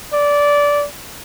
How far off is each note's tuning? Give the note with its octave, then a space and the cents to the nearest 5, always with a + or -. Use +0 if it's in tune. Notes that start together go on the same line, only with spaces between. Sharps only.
D5 -15